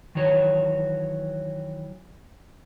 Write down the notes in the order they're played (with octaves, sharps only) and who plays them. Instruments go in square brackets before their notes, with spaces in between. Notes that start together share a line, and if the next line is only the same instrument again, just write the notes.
[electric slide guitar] D#3 E3 F#3 C#5